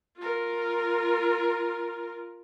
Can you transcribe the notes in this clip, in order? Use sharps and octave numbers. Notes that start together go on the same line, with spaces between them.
F4 A#4